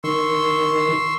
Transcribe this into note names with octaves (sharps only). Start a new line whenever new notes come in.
D#3 C6 C#6 E6